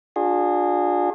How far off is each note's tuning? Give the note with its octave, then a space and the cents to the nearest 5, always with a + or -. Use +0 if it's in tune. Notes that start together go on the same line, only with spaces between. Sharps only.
D4 +10 F4 +45 G#4 -15